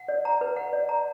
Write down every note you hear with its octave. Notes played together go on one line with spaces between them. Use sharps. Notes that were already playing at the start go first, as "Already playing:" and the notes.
Already playing: F#5
D5
A#5
B4
F#5
D5
A#5